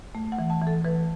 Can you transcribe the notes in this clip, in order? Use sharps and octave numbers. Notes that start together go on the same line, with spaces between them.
A3
F#5
E3
A5
E3
A4
E3 B4